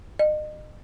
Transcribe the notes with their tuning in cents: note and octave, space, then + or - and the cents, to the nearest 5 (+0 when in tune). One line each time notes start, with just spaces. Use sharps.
D#5 -35